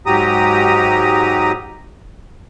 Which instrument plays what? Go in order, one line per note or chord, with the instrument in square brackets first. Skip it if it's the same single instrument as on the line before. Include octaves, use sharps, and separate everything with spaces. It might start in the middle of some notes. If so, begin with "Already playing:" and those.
[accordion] G#2 F#3 G4 A#5 D#6